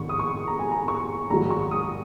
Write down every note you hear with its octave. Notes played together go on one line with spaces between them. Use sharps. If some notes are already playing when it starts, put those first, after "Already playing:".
Already playing: A#1 G#2 D#3 C#6
D#6
C#6
A#5
G#5
A#5
C#6
A#1 G#2 D#3 F#3 A#5
C#6
D#6